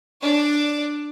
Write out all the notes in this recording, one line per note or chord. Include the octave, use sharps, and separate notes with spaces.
D4 D5